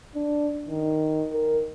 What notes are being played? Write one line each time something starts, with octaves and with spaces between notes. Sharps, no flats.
D4
D#3
A#4